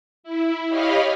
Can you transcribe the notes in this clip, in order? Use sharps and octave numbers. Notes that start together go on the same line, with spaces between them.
E4
G4 C#5 D#5 F5 B5 F6